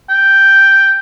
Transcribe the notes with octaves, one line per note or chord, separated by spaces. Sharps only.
G5